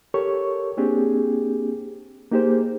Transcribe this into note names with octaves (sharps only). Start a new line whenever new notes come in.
G4 A4 A#4 C#5 C#6
A#3 C4 D4 G4 G#4
A#3 D#4 G4 G#4 C5